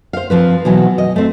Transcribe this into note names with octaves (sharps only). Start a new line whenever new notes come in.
C5 F5
F3 C4 B4
B2 E3 F#3 B3
D#5
A3 C4